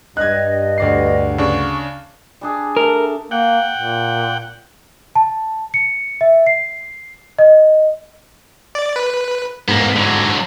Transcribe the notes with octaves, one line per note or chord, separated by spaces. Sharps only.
G2 D#5 F#6 G#6
D2 D5 C7
C#3 D4 C#6
G3 D4 G#4
A3 A#4 A5
A#3 F#5 G5
A#2
A5
C#7
E5
C7
D#5
D5
B4
G#2 A#3 B3
D3 F#3